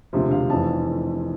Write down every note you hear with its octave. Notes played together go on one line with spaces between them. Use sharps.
E1 D2 C3 F3
F5
F1 F2 E3 A5